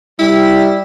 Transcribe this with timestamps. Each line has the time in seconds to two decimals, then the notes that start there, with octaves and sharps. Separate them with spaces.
0.19 G3 E4